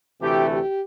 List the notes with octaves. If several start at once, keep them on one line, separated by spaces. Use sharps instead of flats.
D2 C3 E3 A3 G4
G4